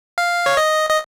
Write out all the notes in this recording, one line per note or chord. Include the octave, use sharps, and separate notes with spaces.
F5
C#5
D#5
D#5